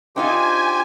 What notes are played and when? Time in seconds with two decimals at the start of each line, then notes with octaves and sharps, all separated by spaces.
0.16 D4 D#4 F4 G4 C5 G5 G#5